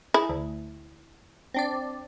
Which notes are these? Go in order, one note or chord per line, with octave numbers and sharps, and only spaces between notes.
E4 G#4
D2
C4 D4 D5